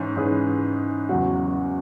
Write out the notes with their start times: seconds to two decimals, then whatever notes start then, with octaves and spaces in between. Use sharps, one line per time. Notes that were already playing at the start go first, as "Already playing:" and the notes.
Already playing: G#2 E3 C#4
0.16 G#2 E3 C#4 G#4 B4
1.09 E2 C#3 F#3 C#4 F#4